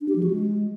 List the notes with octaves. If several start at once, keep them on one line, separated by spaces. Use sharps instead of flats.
D4
G4
F3
F#4
G#3